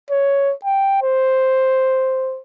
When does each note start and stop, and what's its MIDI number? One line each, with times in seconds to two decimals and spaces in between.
0.10 0.53 73
0.65 0.99 79
1.02 2.40 72